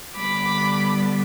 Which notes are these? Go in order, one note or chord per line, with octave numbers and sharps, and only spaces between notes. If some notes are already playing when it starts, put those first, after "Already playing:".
D3 G3 B3 B5 D6